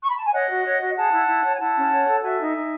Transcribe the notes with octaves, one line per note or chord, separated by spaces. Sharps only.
C#6
B5
A5
G#5
C#5 D#5 F#5
F#4
C#5
F#4
G#4 F#5 A5
E4
E4
C#5
G#5
E4 F#5 A5
C#4
C#5
A4
F#4 E5 G#5
D#4
D#4